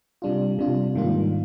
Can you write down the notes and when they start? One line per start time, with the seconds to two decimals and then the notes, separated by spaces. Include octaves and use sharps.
0.22 C3 G3 D4 F4
0.59 C3 G3 D4 F4
0.95 G#2 D#3 G3 A#3 F4